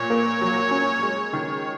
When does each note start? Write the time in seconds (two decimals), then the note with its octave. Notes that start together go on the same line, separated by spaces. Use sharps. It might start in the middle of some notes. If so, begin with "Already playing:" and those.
Already playing: A#2 C#5
0.10 A#3
0.41 F#3
0.71 C#4
1.03 G#3
1.33 D#3